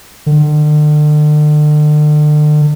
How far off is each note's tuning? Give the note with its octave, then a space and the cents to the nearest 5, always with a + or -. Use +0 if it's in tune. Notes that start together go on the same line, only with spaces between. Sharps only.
D3 +40